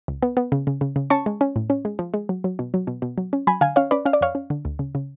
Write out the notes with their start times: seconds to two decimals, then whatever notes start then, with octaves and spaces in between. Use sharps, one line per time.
0.08 C#2
0.22 B3
0.37 B3
0.52 C#3
0.67 C#3
0.81 C#3
0.96 C#3
1.10 C#4 A5 C#6
1.26 G#3
1.41 C#4
1.56 A2
1.70 C#4
1.85 G#3
1.99 F3
2.14 G#3
2.29 F#3
2.44 F#3
2.59 B2
2.74 F#3
2.87 B2
3.02 B2
3.18 F#3
3.33 C#4
3.47 F#3 G#5 B5
3.61 D3 F5 G#5
3.76 C#4 C#5 F5
3.91 C#4 B4 D5
4.06 C#4 F5
4.13 D5
4.21 F2 C#5 F5
4.35 C#4
4.50 D3
4.65 D2
4.79 C#3
4.95 C#3